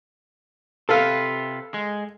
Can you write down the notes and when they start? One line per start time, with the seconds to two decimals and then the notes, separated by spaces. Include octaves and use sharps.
0.89 C3 F4 A4 B4 F5
1.74 G#3